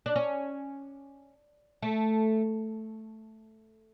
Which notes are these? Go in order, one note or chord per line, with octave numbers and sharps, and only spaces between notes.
D4
C#4
A3